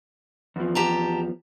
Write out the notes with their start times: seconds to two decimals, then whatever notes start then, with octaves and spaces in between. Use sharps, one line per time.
0.56 E2 F3
0.75 G4 A5 A#5